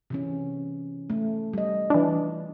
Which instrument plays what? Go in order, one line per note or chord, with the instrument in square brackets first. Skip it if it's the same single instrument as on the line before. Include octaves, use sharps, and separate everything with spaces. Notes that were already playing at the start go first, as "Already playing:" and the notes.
[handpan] C3 E3 C#4
A3
G3 D#5
[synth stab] E3 D4 [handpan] F4